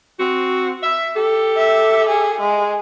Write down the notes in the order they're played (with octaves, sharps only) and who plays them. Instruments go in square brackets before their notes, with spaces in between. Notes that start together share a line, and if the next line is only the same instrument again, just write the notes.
[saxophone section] C4 F#4
E5
G4 A4
[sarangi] E5
G#4
G#3